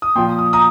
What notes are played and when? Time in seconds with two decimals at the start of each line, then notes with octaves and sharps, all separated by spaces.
0.02 D#6
0.15 A#2 F3 G5 C6
0.39 D#6
0.53 A#5 D#6